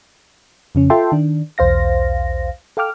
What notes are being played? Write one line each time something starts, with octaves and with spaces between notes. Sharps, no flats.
F2 C#3 C#4
F4 A4 E5 G5 A5 C6
D#3 D4
B1 E2 C5 F5 A#6
A4 F5 G5 D6 F6